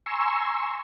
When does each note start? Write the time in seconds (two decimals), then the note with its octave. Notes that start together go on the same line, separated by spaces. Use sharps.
0.06 G#5 A#5 C6 C#6 E6